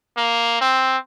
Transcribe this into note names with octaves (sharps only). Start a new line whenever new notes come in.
A#3
C4